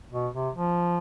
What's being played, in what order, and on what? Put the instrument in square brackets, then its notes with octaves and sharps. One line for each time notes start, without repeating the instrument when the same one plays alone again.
[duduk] B2
C3
F3